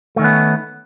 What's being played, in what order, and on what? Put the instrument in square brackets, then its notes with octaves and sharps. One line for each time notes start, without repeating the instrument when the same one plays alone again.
[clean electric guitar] A3
D#3
C#4
B3